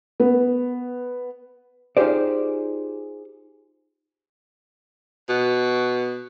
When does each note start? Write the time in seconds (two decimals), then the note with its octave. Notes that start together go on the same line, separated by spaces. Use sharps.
0.20 B3
1.97 D#4 F4 G4 G#4 C5 D5
5.29 B2